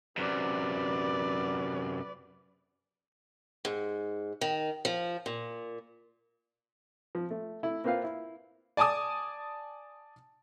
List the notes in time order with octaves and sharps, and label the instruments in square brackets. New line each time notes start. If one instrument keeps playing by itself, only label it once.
[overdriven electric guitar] F#2 C3 [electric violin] B4 D5
[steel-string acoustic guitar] G#2
D#3
F3
A#2
[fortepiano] F3
A3
A3 E4
A#3 C4 F4 B4 F5
E4
[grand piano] D5 G#5 A5 D6 D#6